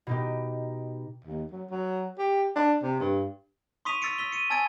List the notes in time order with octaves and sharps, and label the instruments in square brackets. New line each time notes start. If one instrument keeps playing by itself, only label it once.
[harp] B2 D#4 G4
[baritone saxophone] D#2
F#3
F#3
G4
D4
C3
G2
[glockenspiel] C6 C#6 D#6 B6 D#7 F7
E6 A6 B6 C#7 D7
E6 B6 G7
C#7 D#7
G#5 A5 E6 G#6 A6 D7